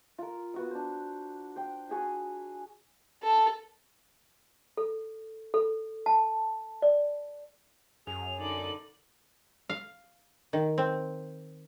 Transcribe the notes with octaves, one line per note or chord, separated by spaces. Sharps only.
F4 A#4
B3 F#4 D#6
D4 C5
C5 G5
F#4 G#4 G#5 B5
A4
A4
A4
A5
D5
F#2 G#4 F7
D3 D#4 D5 F#7
F5
D#3
C4